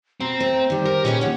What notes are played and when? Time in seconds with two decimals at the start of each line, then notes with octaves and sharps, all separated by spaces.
0.21 B2 C4 A#5
0.40 A3 C5
0.70 D#3 G3 G4
0.85 G3 A#4
1.05 A#2 C#4 G#4 B4 D#5
1.21 D#2 F3 D#4 C#5 F#5